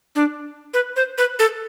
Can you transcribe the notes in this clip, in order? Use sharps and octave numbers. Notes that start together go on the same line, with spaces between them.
D4
B4
C5
B4
A4